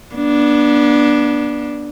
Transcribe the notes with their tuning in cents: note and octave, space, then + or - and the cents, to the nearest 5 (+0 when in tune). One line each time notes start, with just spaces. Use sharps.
B3 -35 D4 +0